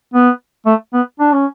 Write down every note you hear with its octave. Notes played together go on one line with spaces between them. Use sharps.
B3
A3
B3
D4
C#4